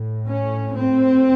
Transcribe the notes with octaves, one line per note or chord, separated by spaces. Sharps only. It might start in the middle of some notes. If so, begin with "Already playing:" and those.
Already playing: A2
C#4
C4